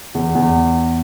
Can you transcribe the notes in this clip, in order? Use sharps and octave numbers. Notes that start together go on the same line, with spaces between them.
E2
E2